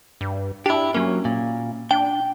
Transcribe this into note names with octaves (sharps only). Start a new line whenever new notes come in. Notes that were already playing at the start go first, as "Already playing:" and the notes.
G2
D4 E4 G4
F#3 A#3 C#4
A#2
D4 G5